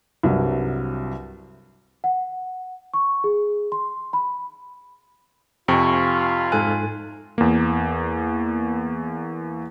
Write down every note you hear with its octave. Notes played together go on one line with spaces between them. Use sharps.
C2 G2 C3 F#3
F#5
C#6
G#4
C6
B5
F2 C3 F4 G5 G#5 C#6
G#2 A4 G#5 F#6
E2 A#3